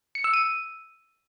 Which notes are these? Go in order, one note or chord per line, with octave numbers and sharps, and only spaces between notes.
C#7
E6
D#7